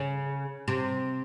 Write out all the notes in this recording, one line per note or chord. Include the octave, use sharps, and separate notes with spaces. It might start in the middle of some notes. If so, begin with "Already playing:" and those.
Already playing: C#3
C3